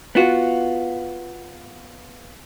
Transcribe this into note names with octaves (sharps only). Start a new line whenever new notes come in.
B3 F4 F#4